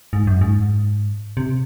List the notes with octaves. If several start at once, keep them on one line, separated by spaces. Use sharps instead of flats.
G#2
F#2
G#2
C3